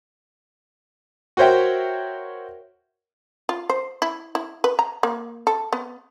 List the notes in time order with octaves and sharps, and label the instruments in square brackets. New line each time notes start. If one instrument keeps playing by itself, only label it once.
[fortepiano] F#4 A#4 C5 C#5 E5 G5
[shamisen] F4
C5
E4
E4
B4
A#5
A#3
A4
B3